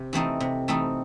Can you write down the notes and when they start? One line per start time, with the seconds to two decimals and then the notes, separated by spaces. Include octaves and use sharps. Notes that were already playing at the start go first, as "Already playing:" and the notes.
Already playing: C3
0.13 E3 A3 C4 D#4
0.40 C3
0.68 E3 A3 C4 D#4